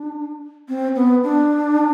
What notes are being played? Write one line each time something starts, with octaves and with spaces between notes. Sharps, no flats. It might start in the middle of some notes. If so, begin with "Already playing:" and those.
Already playing: D4
C4
B3
D4